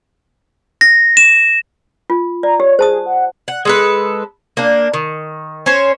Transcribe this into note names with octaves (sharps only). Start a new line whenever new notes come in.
A#6
E7
F4
D5 A#5
G4 C#5
G#4 C5 A5 D#6
F#5
F#5
G#3 A4 B4
A#3 D4
D#3
C#4 C5 C#5